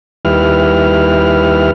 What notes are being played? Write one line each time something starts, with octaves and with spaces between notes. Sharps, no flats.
D#2 G3 E4 B4 F6